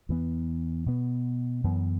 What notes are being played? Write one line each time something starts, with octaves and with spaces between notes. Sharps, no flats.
E2 E3 B3
B2 B3
F#2 E3 B3